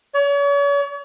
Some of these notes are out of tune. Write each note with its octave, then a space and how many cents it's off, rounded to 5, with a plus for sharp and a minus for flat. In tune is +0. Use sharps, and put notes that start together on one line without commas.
C#5 +40